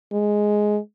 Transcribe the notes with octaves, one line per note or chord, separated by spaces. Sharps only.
G#3